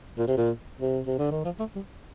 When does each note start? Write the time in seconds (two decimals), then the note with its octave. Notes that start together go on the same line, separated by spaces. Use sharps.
0.18 A#2
0.28 C3
0.37 A#2
0.81 C3
1.06 C3
1.18 D3
1.31 D#3
1.45 F3
1.59 A3
1.75 G3